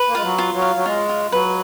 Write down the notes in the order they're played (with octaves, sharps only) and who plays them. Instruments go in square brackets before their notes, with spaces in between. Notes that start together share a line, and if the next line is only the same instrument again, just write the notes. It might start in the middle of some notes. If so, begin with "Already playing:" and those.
Already playing: [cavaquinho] B4
[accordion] A#3
[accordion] G#3 [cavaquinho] F4
[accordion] F#3
[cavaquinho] F4
[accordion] F#3
[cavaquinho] F5
[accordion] F#3
[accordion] G#3 [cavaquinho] F4
[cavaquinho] F4
[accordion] F#3 [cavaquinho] B4